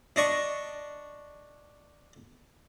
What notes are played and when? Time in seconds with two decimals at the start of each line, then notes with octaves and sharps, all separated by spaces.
0.16 D4 D#5 C#6